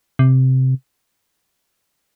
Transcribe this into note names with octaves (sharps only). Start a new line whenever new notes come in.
C3